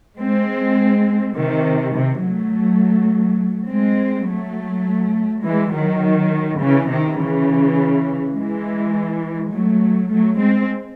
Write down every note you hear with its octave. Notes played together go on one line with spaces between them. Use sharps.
G#3 C4
C3 D#3
C3
F#3 A3
G#3 C4
F#3 A3
E3 G#3
D#3 F#3
C#3 E3
C3 D#3
C#3 E3
E3 G#3
F#3 A3
F#3 A3
G#3 C4